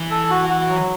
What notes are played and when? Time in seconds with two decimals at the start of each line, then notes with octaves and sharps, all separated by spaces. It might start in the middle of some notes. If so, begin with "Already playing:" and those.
Already playing: E3
0.11 A4
0.30 F#4
0.50 F#4
0.69 F#3